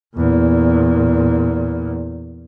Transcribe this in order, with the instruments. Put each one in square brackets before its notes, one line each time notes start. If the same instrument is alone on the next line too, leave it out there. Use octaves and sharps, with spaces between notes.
[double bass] E2 A#2